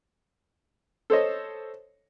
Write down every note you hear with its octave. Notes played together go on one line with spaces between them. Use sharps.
A4 C5 C#5 D#5